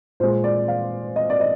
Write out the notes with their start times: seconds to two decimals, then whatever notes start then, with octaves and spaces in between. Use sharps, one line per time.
0.20 A#2 G#3 C5
0.44 D5
0.68 F5
1.16 D#5
1.30 D5
1.40 D#5